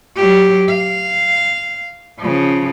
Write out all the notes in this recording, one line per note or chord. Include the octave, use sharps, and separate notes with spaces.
F#3 G4
F5
C#3 F3